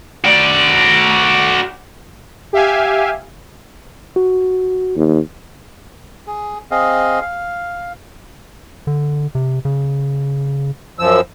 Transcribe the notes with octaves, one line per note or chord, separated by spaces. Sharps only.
F#4 D5
G4 E5 F5 G#5
F#4
D#2
G#4
C4 G#4 D#5 F5
F5
D3
C3
C#3
F#2 F3 E6